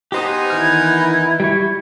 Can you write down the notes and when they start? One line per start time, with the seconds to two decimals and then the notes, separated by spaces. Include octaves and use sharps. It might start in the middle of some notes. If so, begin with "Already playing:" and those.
0.12 B3 D#4 G4 C5 G#5 D#6
0.50 D#3 E3 E4 F6 G#6
1.40 G3 G4 C#6